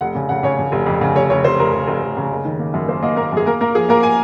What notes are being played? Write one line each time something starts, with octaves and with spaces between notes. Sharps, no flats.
F1 F#5
C#3
C#3 F#5
C#3 C#5
C#3
F1
F2
C#3
F1 C#5
F1 C#5
F1 C5
F1 A#4
F1
F1
F1
C#3
F#1
D#3
A#3
F#2
A#3 C5
A#3 D#5
A#3 A#4
F#2 G#4
A#3 A#4
A#3 A#4
F3 G#4
A#3 A#4
G#5